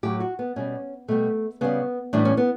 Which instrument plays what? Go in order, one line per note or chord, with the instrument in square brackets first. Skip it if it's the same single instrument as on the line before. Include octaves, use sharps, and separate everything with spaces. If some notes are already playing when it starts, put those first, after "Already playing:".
[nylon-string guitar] A2 F#3 G4
F#4
B3
B2 G3 C#4
B2 G3 A3
C#3 G3 B3
A2 E3 G3 D4
C#4
B3